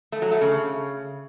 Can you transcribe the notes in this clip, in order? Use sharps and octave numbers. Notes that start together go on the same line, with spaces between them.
A3
F#3
A3
C#3